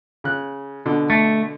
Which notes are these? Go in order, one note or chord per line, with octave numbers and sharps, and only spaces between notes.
C#3 F#6
B2 D3
A3